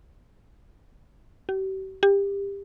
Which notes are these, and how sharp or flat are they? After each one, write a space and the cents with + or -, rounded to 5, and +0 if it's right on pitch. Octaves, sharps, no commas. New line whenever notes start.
G4 -40
G4 +25